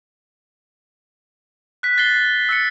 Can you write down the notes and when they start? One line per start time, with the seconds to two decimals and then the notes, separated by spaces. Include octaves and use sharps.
1.83 F#6 B6
1.97 F#6 A6 B6 C7 G7
2.49 E6 F#6 A6 C#7